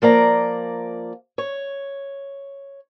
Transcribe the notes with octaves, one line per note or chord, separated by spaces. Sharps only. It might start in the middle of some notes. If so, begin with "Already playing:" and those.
F3 A#3 D5 A#5
C#5